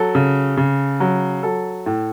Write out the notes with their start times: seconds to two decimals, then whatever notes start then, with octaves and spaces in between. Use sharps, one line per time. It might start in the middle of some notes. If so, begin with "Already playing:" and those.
Already playing: F#3 A4
0.15 C#3
0.57 C#3
1.00 F#3
1.43 F#3 A4
1.86 A2